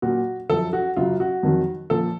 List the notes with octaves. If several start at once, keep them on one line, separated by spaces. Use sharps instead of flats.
A#2 F#3 F#4
F#2 F3 A4
F#4
F#2 C#3 F#3 F4
F#4
F2 D#3 F#3
A#2 F3 A4